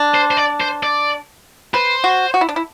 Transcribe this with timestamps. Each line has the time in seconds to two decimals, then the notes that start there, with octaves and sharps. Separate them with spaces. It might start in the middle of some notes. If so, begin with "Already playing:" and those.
Already playing: D4
0.14 C5
0.31 C5
0.37 D5
0.61 C5
0.83 D5
1.74 B4 C5
2.04 F#4
2.34 F#4
2.41 E4
2.49 D4
2.56 E4